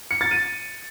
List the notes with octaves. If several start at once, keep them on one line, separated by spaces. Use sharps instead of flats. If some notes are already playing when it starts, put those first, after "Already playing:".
C#7
A6
D#7